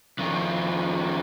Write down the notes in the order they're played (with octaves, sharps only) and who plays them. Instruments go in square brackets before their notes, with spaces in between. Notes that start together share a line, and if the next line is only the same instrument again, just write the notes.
[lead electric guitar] F2 D#3